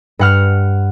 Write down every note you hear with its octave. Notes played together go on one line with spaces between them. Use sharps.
G2 F#5 F6